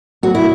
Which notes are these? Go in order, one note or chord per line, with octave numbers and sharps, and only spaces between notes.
B2 F#3 A3 F#4
E4